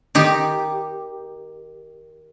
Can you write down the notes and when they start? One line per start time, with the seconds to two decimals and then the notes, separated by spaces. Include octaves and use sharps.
0.15 D#3 D#4 G4